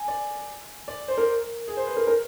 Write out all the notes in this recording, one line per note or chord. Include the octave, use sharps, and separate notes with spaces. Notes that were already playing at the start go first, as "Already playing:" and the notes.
Already playing: G#5
D5
D5
C5
A#4
G#4
C5
B4
A#4
A#4